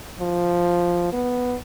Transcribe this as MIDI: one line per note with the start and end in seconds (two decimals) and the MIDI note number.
0.20 1.08 53
1.13 1.56 59